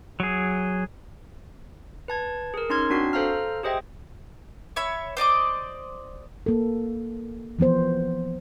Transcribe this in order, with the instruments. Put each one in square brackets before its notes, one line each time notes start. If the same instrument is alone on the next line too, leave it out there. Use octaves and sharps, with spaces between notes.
[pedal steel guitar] F#3 G#4
[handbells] B4 A5 G#6
G#4 A#4
C#4 D#4 C6 F6 G#6
C4 D4 F#4 C7
A4 C5 F5 A#5 F6
G4 G#4 C5 D#5 E5 G5
[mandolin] C#5 E5 B5
C5 D5 D#5 D6
[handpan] A#3 A4
E3 F3 B3 C5